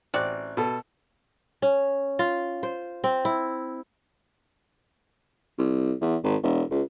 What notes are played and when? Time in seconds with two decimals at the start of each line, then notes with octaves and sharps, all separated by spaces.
0.14 A1 C4 F#4 D5 F#6
0.57 B2 A4
1.62 C#4
2.19 F4
2.63 C5
3.04 C4
3.25 E4
5.58 C2
6.01 E2
6.24 G#1
6.43 E1
6.71 C#2